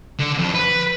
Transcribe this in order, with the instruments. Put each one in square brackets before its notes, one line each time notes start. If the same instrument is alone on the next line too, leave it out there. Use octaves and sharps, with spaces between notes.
[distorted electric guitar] D3
F2
B4